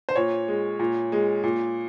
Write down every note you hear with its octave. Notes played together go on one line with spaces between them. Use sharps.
C5
A#2 C#5
G#3
A#2
G#3
A#2